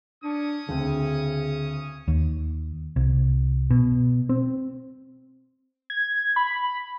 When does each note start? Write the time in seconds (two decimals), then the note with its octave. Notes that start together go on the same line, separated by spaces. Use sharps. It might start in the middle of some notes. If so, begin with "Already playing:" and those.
0.24 C#4 D4 C#6 D#6
0.69 D2 C#3 C4
2.08 D#2
2.96 C2
3.70 B2
4.29 C4
5.90 G#6
6.36 B5